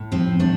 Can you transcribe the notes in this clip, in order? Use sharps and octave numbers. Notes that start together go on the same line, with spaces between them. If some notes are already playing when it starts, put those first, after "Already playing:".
Already playing: A2
F3 C4
A2 D4